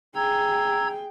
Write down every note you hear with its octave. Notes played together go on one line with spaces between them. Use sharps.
G#4 G5 A#5 E6 G#6